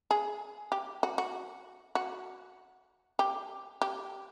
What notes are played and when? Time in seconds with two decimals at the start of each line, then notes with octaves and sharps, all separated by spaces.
0.11 G#4
0.72 G4
1.03 F#4
1.18 F#4
1.95 F#4
3.19 G4
3.82 G4